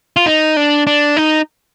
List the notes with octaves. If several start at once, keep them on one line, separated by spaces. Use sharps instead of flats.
F4
D#4
D4
D4
D#4